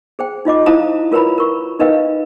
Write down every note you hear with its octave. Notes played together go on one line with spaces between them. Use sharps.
G#4 C5 G5
D#4 F4 D#5 D6
E4 C5 F5 A5 A#5 D#6
F4 A#4 B4 C#5 A#5 B5
A#4 C#6
D#4 A#4 B4 D#5 F5 G5